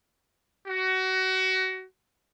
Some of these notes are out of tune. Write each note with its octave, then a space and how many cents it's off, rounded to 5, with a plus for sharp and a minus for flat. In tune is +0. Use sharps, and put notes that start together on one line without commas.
F#4 +25